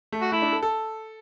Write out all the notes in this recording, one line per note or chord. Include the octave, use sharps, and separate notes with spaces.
A3
F#4
A3 E4
D4
A4
A4